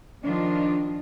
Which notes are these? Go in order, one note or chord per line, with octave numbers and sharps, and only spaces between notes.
D#3 F3 D4 D#4 F4